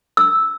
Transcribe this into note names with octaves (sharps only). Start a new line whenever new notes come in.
E6